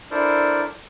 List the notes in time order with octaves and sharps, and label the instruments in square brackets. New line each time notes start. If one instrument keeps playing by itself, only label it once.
[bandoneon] D4 E4 A4 A#4 C5 D5